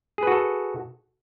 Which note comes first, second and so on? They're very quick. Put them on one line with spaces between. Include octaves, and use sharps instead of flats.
G#4 B4 F#4 A4